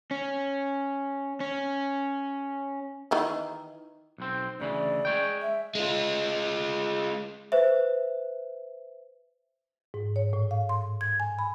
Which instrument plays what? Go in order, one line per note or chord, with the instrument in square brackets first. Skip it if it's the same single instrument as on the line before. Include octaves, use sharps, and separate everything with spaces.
[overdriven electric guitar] C#4
C#4
[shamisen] D#3 E3 D#4
[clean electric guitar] B1 C4
[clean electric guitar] D2 C#3 E3 [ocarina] D5
[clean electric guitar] G#3 C#5 G5
[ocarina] E5
[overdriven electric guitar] G#3 F4
[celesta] B4 C5 E5
[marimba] G#2
C#5
A2
F5
C6
G#6
G#5
B5